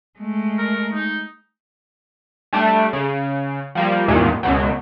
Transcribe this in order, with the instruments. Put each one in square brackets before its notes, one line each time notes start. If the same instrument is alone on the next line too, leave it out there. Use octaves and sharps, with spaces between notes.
[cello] G#3 A3
[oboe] A#4
D#4
[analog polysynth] G3 A3 D4
C#3
F3 G3 A#3
A1 E2 G2 A#2 D#3 G#3
C#2 F#2 B2 F#3